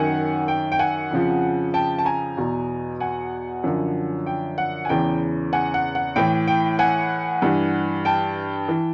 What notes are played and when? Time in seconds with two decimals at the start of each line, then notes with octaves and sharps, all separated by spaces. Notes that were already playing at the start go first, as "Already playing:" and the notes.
Already playing: F#2 D#3 F#5 G#5
0.48 G5
0.72 G5
0.79 F#5 G#5
1.11 F2 C#3 F3
1.74 G5 A5
1.98 A5
2.05 G#5 A#5
2.37 E2 B2
3.00 F#5 G#5
3.64 F#2 D3 F3
4.26 G5
4.58 F#5
4.85 G#5
4.89 E2 C#3 E3 G5
5.53 F#5 G#5
5.74 F#5
5.95 F#5
6.16 A2 E3 G5
6.48 G5
6.79 F#5 G#5
7.42 G2 E3
8.05 G5 A5
8.68 E3